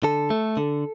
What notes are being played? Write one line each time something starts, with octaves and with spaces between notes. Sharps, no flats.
D3 A4
A3
D3